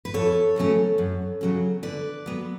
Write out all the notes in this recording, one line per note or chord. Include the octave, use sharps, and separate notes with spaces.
B4
F2 A4 C#5
C#3 F#3 A3 C#4
F#2
C#3 F#3 C#4
D3 B4 D5
F#3 B3